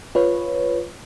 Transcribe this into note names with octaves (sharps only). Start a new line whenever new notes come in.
F4 B4 C#5